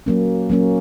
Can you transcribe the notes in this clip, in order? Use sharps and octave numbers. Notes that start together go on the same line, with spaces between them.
F#3 A#3 C#4
F#3 A#3 C#4